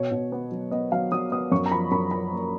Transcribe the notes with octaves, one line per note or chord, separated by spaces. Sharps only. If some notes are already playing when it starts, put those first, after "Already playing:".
Already playing: B2 C#5
B2
B3
F#3
B3 D#5
F#3 F5
F#3 D#6
B3 D#6
F#2 C#6
A#5
F3 B5
F#2 B5
F3 B5
A#3